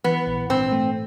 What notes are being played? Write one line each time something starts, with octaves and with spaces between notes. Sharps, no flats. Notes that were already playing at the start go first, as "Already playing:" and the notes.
E3 B3
A#1
G#2 C4
A3